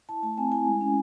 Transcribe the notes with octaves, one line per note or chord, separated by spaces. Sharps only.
E4 A5
A3 A5
C4 G#5
E4 G#5
G#3
C#4